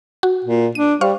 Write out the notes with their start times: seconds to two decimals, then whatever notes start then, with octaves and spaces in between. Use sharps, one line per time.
0.23 F#4
0.44 A#2
0.75 D4 D#7
1.01 G3 C5 F5 C#6